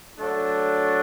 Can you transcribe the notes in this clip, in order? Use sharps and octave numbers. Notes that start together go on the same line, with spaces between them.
F#3 A3 D4